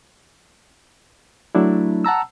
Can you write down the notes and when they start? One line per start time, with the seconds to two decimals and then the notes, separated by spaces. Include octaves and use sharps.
1.55 F#3 A3 D4 E4
2.05 F#5 A5 A#5 E6